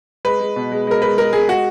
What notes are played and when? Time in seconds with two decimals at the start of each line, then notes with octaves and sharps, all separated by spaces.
0.25 G#3 B4
0.40 G#3
0.56 B2
0.72 G#3
0.87 G#3 A#4
1.02 G#3 B4
1.17 G#3 A#4
1.33 G#3 G#4
1.48 G#3 F#4